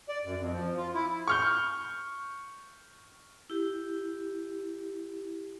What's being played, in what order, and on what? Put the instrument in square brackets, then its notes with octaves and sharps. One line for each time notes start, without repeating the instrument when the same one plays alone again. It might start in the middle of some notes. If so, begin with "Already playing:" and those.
[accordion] D5
F#2
F2
F3
F4
E4
[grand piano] C#6 F6 G6
[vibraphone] E4 G4